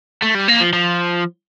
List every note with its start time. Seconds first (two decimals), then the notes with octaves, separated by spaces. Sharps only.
0.22 A3
0.35 G3
0.48 A#3
0.61 F3
0.73 F3